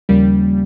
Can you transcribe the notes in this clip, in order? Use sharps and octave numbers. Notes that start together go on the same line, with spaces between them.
D#2 C#3 F3 G3 A#3 C#4